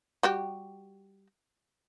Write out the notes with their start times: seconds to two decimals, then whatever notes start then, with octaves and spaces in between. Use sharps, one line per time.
0.23 G3 F#4 G4